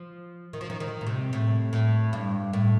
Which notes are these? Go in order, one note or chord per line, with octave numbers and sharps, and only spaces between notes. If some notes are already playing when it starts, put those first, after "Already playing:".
Already playing: F3
D#3
F3
D#3
D#3
A#2
C3
A2
A2
G2
A2